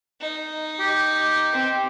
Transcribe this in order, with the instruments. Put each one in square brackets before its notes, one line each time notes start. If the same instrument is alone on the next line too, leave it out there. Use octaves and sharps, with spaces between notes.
[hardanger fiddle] D#4
[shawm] G4
[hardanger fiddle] C4